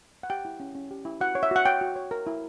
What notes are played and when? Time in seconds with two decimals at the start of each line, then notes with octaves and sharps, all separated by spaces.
0.23 F#5
0.30 G4 G5
0.45 E4
0.60 C#4
0.75 C#4
0.91 G4
1.05 E4
1.21 F#4 F#5
1.35 C#5
1.43 E5
1.51 F#4 F#5
1.65 C#5 G5
1.81 F#4
1.96 C#5
2.11 A#4
2.27 E4